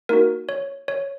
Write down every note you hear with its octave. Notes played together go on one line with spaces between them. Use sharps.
A#3 D#4 F#4 A#4
C#5
C#5